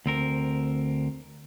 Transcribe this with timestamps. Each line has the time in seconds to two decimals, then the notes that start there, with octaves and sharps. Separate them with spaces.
0.06 D2 C4 A#4